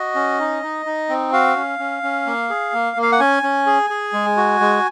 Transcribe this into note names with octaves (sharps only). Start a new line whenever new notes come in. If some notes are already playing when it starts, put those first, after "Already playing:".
Already playing: F#4 D#5
C#4
D#4
D#4
D#4
C4
F#4 F5
C#4
C#4
C#4
A#3
G#4
A#3
A#3
F5
F#5
C#4 G#5
C#4
G#4
G#4
G#3
F#4
G#3